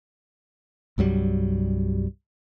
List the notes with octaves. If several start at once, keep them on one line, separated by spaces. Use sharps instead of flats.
C2 G2 F#3 G3